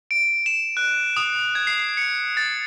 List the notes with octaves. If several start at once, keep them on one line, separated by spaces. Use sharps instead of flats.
D7
E7
F#6
D#6
G#6
C7
C#7
A6